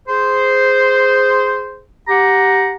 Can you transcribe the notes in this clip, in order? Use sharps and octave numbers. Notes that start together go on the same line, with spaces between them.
G#4 C5
G4 F#5 A#5